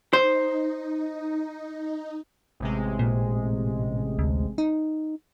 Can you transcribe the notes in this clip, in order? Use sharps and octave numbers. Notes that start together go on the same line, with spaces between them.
D#4 C5
A1 C3 G#3
A#2
D2
D#4